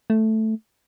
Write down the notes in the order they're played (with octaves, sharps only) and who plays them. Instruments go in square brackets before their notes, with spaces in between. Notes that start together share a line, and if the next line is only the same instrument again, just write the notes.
[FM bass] A3